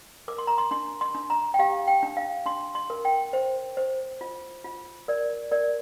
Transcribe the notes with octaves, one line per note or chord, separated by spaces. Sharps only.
A#4 D6
C6
A#5
C6
D4 C6
C6
D4
A#5
G5
G4 F5
G5
D4
F5
D4 C6
C6
A#4
G5
C5
C5
F4
F4
A#4 D5
A#4 D5